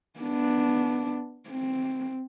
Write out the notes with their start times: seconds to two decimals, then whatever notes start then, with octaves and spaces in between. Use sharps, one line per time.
0.20 B3 D4
1.50 C4